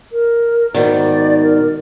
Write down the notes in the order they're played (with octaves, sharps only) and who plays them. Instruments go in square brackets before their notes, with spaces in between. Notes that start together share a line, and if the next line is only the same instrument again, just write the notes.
[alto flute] A#4
[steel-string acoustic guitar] G#2 B2 D#3 [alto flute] D5
[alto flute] A#4